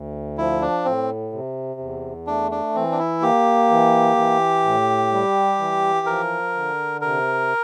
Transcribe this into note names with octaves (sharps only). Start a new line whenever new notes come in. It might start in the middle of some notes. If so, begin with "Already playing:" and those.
Already playing: D2
F3 E4
D4
A2 C4
C3
E2
A3 D4
D4
E3 C4
D4
E4
A#3 G4
E3
E3
A2
G3
E3
F3 A#4
D3
C3 A#4